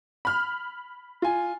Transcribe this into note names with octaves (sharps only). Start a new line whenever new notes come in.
B5 F6
F4 G#5